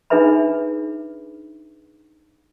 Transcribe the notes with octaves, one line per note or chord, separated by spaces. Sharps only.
D4 D#4 G#4 B4 E5 B5